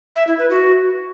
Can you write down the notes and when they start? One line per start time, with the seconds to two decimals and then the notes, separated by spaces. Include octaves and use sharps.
0.16 E5
0.27 E4
0.39 B4
0.50 F#4